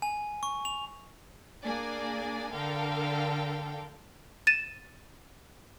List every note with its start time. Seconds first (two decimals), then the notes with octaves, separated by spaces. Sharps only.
0.02 G#5
0.43 C#6
0.65 F7
1.63 A#3 D4 G#4 D5 G#5
2.52 D3 A4 A#4 F5 G5
4.47 A6 D#7 E7